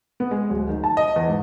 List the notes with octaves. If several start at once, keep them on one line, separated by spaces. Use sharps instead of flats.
B3
G#3
D1
D#3
A5
D#5
E2
G#2